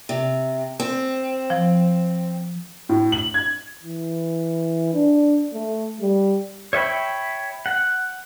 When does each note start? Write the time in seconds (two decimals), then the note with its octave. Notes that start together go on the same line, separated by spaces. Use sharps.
0.09 C3
0.80 C4
1.50 F3
2.89 A2
3.12 F#7
3.34 G#6
3.83 E3
4.94 D4
5.53 A3
6.01 G3
6.73 C#5 E5 G5 B5
7.66 F#5